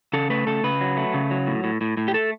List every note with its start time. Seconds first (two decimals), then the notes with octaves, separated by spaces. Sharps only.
0.13 C#3 A4
0.30 A3 B4
0.47 C#3 A4
0.63 C#3 B4
0.81 F#3
0.97 A3
1.14 C#3
1.31 F#3
1.47 A2
1.64 A2
1.81 A2
1.97 A2
2.08 G4
2.14 A3 A4